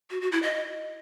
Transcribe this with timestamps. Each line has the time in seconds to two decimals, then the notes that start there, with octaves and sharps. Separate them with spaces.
0.10 F#4
0.21 F#4
0.32 E4
0.43 D#5